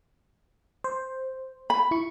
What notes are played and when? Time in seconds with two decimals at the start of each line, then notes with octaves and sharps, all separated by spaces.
0.84 C5
1.70 B5
1.91 E4 C#6